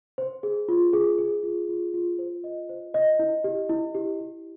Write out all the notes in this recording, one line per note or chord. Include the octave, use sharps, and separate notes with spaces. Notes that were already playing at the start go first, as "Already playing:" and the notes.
C5
G#4
F4
G#4
G#4
F4
F4
F4
C5
D#5
C5
D#5
E4
G4
E4
G4
G4